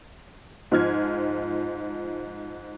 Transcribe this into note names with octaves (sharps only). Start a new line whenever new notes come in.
G#2 F3 F6 G#6